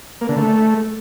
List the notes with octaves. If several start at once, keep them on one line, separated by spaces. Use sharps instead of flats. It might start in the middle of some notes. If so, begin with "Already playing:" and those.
A#3
D3
A3